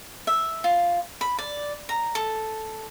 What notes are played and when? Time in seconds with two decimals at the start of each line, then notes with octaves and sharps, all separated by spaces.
0.27 E5
0.64 F4
1.21 B5
1.38 D5
1.89 A#5
2.15 A4